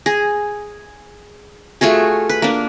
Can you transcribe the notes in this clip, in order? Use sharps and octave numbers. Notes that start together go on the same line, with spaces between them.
G#4
A3 F4 F#4 G#4
B4
A#3 D4